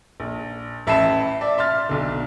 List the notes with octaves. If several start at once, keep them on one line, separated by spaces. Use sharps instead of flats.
A#1
A1 E5 A5 B5 C7 E7
D5 E5
E5 C6 F6 A6
B1 D3